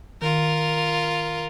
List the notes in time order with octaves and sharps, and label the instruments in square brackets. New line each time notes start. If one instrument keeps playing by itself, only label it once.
[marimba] D#3 [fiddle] F4 A#4